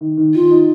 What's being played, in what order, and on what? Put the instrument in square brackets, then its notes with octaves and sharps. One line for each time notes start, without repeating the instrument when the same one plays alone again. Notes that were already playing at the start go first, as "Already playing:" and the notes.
[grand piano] D#3
D#3
[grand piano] D#3 [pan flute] F4
[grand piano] D#4